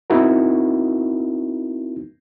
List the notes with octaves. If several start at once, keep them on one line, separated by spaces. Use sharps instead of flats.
B3 C4 D#4 E4 F#4 A#4